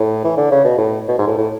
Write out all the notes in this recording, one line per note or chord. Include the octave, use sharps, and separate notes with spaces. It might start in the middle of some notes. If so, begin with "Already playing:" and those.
Already playing: A2
E3
D3
C#3
B2
A2
B2
G#2
A2
A2